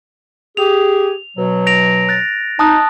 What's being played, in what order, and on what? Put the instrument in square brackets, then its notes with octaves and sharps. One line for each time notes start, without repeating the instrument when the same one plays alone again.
[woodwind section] G4 G#4 [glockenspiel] F7
[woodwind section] B2 F#3
[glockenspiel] A#6 D7 F7
F#6 A6
[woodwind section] D#4 [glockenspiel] A5 D#6 F#6